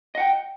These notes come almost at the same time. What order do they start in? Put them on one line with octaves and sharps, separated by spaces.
D#5 F#5 G5